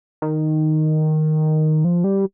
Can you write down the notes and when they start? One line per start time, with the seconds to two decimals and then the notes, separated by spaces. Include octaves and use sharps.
0.22 D#3
1.84 F3
2.04 G3